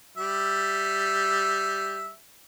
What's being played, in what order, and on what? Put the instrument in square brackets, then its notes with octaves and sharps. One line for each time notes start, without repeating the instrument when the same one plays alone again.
[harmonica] G3 E5